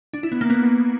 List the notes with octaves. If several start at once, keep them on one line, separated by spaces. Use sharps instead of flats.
D4
E4
B3
A#3
B3